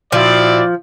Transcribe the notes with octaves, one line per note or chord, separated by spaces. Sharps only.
A#2 F3 C4 E4 F#4 D5